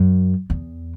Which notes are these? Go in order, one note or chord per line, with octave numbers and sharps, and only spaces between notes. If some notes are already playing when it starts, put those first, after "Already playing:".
Already playing: F#2
E2